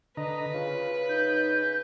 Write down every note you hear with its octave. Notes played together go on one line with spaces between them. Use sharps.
D3 B4 D#5 A#5
C#3 F4
D#4 G6